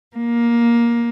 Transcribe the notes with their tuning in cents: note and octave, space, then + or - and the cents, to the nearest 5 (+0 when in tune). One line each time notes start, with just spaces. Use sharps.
A#3 +15